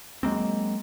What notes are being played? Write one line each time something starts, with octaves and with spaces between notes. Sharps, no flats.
F#3 G#3 A#3 C4